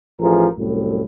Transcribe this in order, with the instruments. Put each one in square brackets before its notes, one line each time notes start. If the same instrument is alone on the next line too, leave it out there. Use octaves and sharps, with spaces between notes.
[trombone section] A1 F3 G#4 A#4
C2 F#2 A2